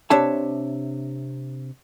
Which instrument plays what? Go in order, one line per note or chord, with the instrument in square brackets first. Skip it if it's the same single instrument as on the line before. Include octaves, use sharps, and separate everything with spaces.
[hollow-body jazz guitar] C3 D4 C#5 E5 A5